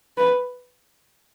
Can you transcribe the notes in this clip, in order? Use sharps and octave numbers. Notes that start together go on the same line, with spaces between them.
B4